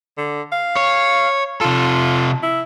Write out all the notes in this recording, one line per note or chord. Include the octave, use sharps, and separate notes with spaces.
D3
F5
C#5
C3 F4 A4
E4